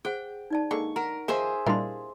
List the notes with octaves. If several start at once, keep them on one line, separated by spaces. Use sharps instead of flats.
G#4 C5 F#5 G5
D#4 D5 A5
D3 G#3 A#3 C#6
A#4 F#5 A#5
D#3 F3 G#4 C5 E5
A#2 G3 D4 E4 A#4 D#5 F5 C6